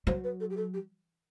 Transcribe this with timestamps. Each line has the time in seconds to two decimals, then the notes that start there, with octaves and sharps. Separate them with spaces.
0.07 F#3 C5
0.24 B4
0.40 A4
0.50 G4
0.57 A4
0.74 G4